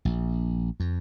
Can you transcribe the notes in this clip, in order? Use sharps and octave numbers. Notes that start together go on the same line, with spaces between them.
A#1
F2